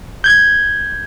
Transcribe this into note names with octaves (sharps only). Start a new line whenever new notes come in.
G6 G#6